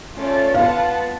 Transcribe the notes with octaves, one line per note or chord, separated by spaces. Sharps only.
A3 C#4 F4 A4 D5
B3 F4 B4 F5 F#5 A5